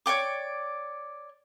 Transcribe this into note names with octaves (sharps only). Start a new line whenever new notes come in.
C#5 D5 G5 D6